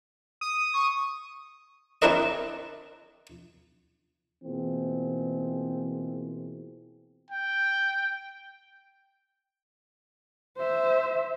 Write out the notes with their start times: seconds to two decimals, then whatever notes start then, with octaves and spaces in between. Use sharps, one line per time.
0.41 D#6
0.73 C#6
2.02 C4 D4 E4 A#4 B4 D#5
4.44 B2 E3 A#3 C4 F4 G#4
7.31 G5
10.57 C5 E5